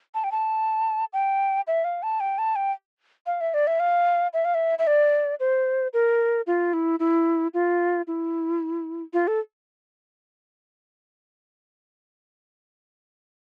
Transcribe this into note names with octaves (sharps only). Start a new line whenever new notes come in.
A5
G5
A5
G5
E5
F5
A5
G5
A5
G5
F5
E5
D5
E5
F5
E5
F5
E5
E5
D5
C5
A#4
F4
E4
E4
F4
E4
F4
A4